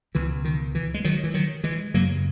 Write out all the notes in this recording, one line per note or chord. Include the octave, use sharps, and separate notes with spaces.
C#2 B2 E3
D#3
E3
G#3
D#3 F#3
E3
D#3 F#3
E3 G#3
F#2 C#3 F#3 A#3